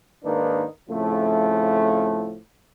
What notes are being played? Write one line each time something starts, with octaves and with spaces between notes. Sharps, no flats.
G#2 D#3 A#3 D4 D#4 B4
F2 A2 C#3 F3 A3